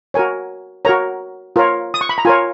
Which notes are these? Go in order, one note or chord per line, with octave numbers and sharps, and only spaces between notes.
F#4 A#4 C#5 G#5
F#4 A#4 C#5 A#5
F4 A#4 C#5
D#6
C#6
B5
A#5
F4 A#4 C#5 G#5